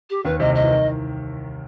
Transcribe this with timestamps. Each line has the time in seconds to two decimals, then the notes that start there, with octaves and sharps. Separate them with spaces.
0.10 G4
0.25 D#2 D#3 B4
0.40 C2 C3 D#5
0.55 D#5
0.64 E3
0.70 D#3